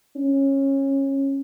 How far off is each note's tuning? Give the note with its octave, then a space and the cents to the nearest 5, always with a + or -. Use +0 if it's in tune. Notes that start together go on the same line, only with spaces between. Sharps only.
C#4 -20